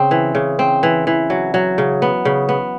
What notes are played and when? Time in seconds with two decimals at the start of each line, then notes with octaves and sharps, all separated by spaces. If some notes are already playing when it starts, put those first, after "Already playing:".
Already playing: C#3 C4
0.11 E3
0.35 C#3
0.59 C4
0.83 E3
1.07 E3
1.30 F#3
1.54 F#3
1.78 C#3
2.02 B3
2.25 C#3
2.49 B3